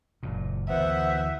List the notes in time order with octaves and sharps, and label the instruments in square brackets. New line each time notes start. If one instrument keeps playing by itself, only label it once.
[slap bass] F#1 A#2
[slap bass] D2 E3 [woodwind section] B3 C5 F#5 [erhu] E5